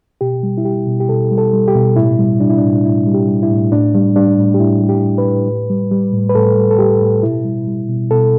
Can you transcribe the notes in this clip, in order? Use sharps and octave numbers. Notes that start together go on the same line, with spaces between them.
B2 G4
G3
E4
G3 G4
B2
G4
B2 A4
G3
A4
G3
G4
B2
A2 E4
G3
G3 D4
E4
D4
A2 E4
D4
A2 E4
G3
G4
G3
E4
A2
A2 D4
G3
G3 D4
A2
G4
A2 E4
G3
G4
G3
B4
A2
A2
G3
G3
A2
B4
A2 A4
G3
A4
G3 G4
A2
B2 E4
G3
G3
B2
B2 A4